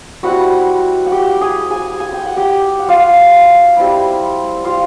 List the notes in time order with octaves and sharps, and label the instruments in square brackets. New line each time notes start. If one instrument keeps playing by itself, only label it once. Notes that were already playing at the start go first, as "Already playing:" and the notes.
[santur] G3 C4 E4 F#4 F#5
F#5
G4 G5
G#4 G#5
G#4 G#5
G#5
G5
F#5
G4 G5
F#5
F4 F5
G3 C4 E4
F4 F5